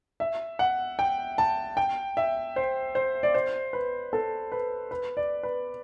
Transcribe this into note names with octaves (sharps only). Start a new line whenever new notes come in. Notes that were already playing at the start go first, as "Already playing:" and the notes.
E5
F#5
G5
A5
G5
E5
C5
C5
D5
C5
B4
A4
B4
B4
D5
B4